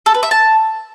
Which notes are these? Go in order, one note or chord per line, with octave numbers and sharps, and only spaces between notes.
A4
B4
E5
A5